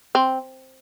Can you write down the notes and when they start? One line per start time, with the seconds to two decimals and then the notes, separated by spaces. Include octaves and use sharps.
0.15 C4